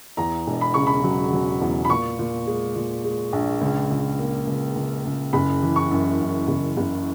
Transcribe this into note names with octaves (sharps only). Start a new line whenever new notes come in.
E2 A#5
E1
B5
C#3 C#6
B5
F#3
F#3
E2
B5
A#2 C#6
A#2
G#3
A#2
G#3
A#1
C#2
C#2
A#3
C#2
C#2
C#2
F#1 B5
E3
C#6
F#2
F#2
F#1
F#1